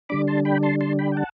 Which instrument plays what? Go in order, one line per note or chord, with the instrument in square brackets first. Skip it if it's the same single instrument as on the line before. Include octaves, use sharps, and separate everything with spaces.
[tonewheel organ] D3 G3 D4 B5 D6
A5 C6
G5 B5
A5 C6
A5 C6
G5 B5
G5
F#5 A5